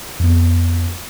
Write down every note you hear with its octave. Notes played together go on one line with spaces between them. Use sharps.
F2 B3